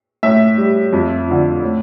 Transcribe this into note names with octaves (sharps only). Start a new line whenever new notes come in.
A2 E5
G3
F2
D3 F3
A2